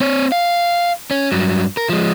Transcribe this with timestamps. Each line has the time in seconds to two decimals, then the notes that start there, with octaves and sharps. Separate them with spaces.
0.01 C4 C#5
0.32 F5
1.11 C#4
1.32 G2 F#3
1.77 A#4
1.89 F3 G#3